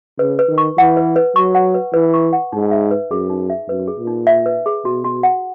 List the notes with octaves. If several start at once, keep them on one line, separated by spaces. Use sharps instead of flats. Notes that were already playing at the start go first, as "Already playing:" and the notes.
C#3 B4
B4
D#3
C#6
E3 F#5
B4
B4
F#3 C#6
F#5
B4
E3 B4
C#6
F#5
G#2 D#4
E5
B4
F#2 G#4
D#4
E5
F#2 B4
G#4
A#2
D#4
E5
B4
G#4
B2 F#4
F#4
F#5